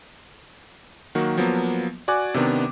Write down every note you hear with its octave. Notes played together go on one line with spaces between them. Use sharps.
D#3 F#3 A#3 F#4
F3 F#3 A#3 B3
F#4 D5 G#5 D6 F#6
C3 D#3 B3 D4